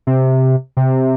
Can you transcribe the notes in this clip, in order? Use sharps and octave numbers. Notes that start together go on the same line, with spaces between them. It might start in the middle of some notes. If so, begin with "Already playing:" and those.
C3
C3